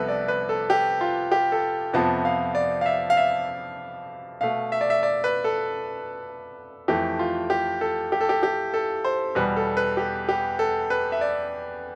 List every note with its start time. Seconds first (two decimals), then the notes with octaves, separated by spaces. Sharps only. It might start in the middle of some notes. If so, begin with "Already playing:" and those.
Already playing: C2 C3 F3 B3 A4 B4
0.09 D5
0.28 B4
0.49 A4
0.70 G4
1.01 F4
1.32 G4
1.52 A4
1.93 F2 C3 F3 B3 A5
2.25 F5
2.55 D5
2.81 F5
2.86 E5
3.10 F5
3.17 E5
4.41 B2 A3 F5
4.72 E5
4.81 D5
4.90 E5
5.03 D5
5.24 B4
5.44 A4
6.88 F2 E3 A3 G4
7.19 F4
7.50 G4
7.81 A4
8.12 G4
8.21 A4
8.29 G4
8.43 G4
8.74 A4
9.04 C5
9.35 E2 B2 G3 B4
9.56 A4
9.77 B4
9.97 G4
10.29 G4
10.59 A4
10.90 B4
11.12 E5
11.21 D5